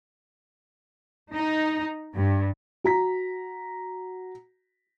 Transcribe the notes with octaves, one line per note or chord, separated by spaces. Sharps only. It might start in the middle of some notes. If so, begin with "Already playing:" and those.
D#4
G2
F#4 A#5 B6